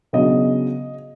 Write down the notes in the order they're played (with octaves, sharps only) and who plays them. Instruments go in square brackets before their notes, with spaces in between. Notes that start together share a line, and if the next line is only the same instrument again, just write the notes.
[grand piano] C#3 F#3 B3 D4 D#5